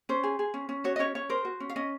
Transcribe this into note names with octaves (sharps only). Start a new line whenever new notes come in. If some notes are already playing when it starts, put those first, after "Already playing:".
C#4 C5
G#4
G#4
C#4
C#4
F#4 C#5
D#5
C#4 C#5
C#4 C#5
A#4 C5
F#4
C#4
F5
C#4 D#5